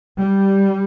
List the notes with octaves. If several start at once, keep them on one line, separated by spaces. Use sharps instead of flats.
G3